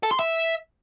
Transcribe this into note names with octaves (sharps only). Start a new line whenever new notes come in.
A4
C6
E5